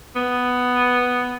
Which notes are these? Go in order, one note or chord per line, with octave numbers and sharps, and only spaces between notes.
B3